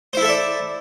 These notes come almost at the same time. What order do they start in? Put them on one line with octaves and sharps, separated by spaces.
C5 E4 A4 E5 D5